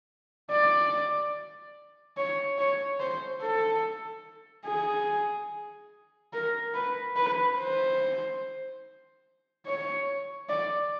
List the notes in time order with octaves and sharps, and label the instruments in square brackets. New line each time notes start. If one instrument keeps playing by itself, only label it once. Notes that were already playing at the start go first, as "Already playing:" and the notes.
[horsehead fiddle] D5
C#5
C#5
C5
A4
G#4
A#4
B4
B4
C5
C#5
D5